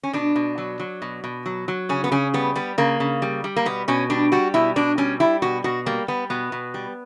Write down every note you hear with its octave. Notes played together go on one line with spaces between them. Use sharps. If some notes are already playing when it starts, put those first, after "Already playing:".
C#4
B2 D4
B2
F#3
F#3
B2
B2
F#3
F#3
C#3 C#4
B3
C#3 C#4
G3 B3
G3 B3
C#3 A#3
C#3
G3
G3
A#3
B2 B3
B2 C#4
G3 D4
G3 F#4
B2 E4
B2 D4
G3 C#4
G3 E4
B2 F#4
B2 F#4
G3 A#3
G3 B3
B2 B3
B2
G3